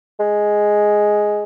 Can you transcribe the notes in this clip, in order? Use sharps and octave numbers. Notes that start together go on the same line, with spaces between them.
G#3